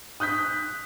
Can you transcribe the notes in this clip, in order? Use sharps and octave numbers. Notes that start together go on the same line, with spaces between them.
D#6 F#6 G6 B6